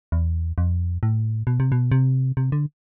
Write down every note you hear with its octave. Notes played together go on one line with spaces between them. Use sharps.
E2
F2
A2
B2
C3
B2
C3
C3
D3